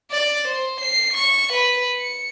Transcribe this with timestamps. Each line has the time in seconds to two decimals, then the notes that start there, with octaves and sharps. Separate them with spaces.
0.11 D5
0.48 C5
0.81 C7
1.13 C#6
1.53 B4
1.97 C#7